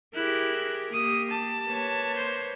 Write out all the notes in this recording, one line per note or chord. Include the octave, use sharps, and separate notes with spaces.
E4 G4 G#4 A#4 F#6
A#3 G4 D#6
A5
A#3 B4 C#5
C5